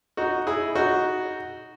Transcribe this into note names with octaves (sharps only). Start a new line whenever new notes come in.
D#4 F#4
E4 G#4
D#4 F#4